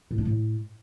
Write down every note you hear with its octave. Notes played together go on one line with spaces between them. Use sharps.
A2
D4
A2